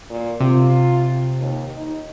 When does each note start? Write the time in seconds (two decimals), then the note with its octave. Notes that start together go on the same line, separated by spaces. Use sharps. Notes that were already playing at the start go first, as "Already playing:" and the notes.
0.10 A#2
0.40 C3 F4
1.40 D#2
1.77 D#4